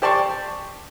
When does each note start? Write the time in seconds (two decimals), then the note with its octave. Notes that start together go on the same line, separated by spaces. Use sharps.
0.02 G4 C5 D5 A5 C6 C#6